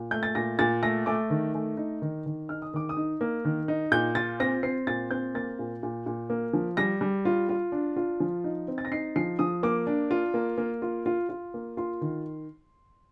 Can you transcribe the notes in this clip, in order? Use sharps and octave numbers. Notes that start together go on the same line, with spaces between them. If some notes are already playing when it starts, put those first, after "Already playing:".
Already playing: A#2
A3 G6
A6
A#2 A#6
A#2 A6
A3 A#6
A3 D6
D#3
A3
D#4
D#3
D#3
D#4 F6
D#6
D#3 D6
D#6
D#4
A#3
D#3
D#4
A#2 G6
F4 A6
C4 A#6
C4 C7
A#2 A6
C4 G6
A#3 A6
A#2
A#2
A#2
A#3
F3
G3 A#6
G3
F4
F4
D4
F4
F3
D#4
C4
A6
A#6
D#4 C7
F3 C7
F3 D#6
A#3 D6
D4
F4
A#3
A#3
F4
F4
F4
A#3
F4 C6
D#3